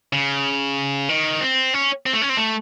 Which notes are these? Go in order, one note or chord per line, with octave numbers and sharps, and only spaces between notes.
C#3
D#3
C4
C#4
C4
A3
C#4
C4
A3